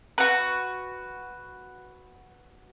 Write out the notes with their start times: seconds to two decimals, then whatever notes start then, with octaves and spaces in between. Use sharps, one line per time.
0.18 F#4 B4